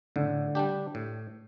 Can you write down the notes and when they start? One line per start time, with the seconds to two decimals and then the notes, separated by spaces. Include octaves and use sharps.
0.16 A2 D3
0.55 G3 D4 G4
0.95 A2